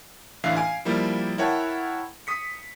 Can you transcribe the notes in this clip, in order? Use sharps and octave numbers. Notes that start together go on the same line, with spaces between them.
A1 D3 E3 E5 F5 C7
F5 G#5 D7
F3 G3 A#3 E4
E4 A#4 C#5 F#5 G5 A5
D#6 B6 C#7